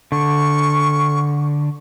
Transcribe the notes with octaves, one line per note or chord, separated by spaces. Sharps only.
D3 C#6